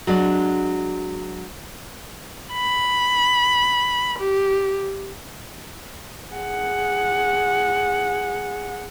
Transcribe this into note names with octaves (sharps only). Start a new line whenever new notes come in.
F#3 G#3 D4
B5
G4
G#4 F#5